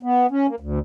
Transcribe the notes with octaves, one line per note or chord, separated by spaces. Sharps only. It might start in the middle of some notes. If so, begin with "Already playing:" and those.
B3
C#4
A#3
D2